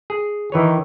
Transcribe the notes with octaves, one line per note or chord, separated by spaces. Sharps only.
G#4
D#3 E3 B4 C#5